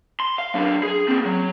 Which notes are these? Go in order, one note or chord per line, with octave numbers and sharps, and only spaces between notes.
C6
F5
F#3 D4
G#4
A#3 C4
F#3